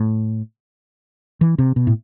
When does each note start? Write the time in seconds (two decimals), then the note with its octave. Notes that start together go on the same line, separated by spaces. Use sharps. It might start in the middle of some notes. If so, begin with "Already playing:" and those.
Already playing: A2
1.41 E3
1.59 C3
1.76 B2
1.87 A2